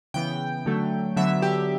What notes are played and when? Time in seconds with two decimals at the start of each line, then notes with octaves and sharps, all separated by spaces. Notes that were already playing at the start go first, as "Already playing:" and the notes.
0.14 C#3 E3 B3 G5
0.66 D3 F#3 A3
1.16 D3 F#3 B3 E5
1.42 G4